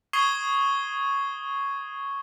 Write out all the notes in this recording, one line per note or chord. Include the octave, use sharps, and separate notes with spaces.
C#6 D#6 G#6 C7 D#7 G7